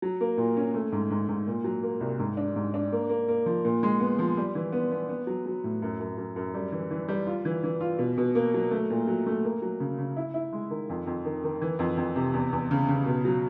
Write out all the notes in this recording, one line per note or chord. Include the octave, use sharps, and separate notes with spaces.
F#3
A#3
A#2
C#4
A3
G#2
G#2
G#2
A#2
F#3
A#3
C2
G#2
D4
G#2
D4
A#3
A#3
A#3
F3
A#2
G#3
B3
F3
G3
E3
B3
B3
B3
F#3
F#3
A2
F#2
F#2
F#2
F#2
G3
E3
E3
G3
F4
E3
E3
F4
B2
B2
A#3
F#3
A3
A#2
F#3
A3
A#3
F#3
C#3
C#3
E4
E4
G#3
D#3
F2
F2
D#3
D#3
E3
F2
F2
C3
E2
E2
C#3
C#3
B2
F#3